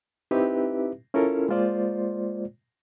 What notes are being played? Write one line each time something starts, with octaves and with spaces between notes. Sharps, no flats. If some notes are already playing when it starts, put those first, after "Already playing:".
C4 D#4 E4 G4 B4 E5
C#4 E4 F4 A4 A#4
G#3 A#3 F4 C5 D5